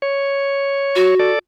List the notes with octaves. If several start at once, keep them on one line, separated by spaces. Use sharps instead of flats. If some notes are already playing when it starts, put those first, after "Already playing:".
C#5
F#4
A4 D5